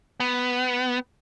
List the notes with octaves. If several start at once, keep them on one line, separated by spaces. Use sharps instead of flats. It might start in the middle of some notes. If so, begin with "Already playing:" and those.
B3